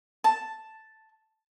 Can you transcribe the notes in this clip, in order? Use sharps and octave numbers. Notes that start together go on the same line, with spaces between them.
A5